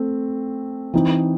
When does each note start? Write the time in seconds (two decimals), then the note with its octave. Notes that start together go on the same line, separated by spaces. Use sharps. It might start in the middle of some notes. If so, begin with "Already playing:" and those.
Already playing: A3 C4
0.94 E3 C4 D#4